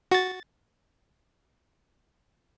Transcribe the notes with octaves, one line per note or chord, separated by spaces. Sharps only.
F#4 A6